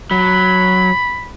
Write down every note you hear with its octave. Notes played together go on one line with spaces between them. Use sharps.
F#3 B5